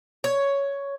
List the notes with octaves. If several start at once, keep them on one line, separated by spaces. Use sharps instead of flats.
C#5